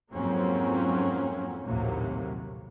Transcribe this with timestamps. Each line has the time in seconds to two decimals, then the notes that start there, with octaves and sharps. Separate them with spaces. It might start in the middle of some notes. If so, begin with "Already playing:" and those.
0.14 F2 G#2 F#3 A#3 C4 C#4
1.65 A#1 D#2 A2 C3 F#3 A#3